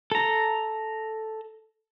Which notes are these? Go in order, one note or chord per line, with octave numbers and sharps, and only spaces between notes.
A4 A#5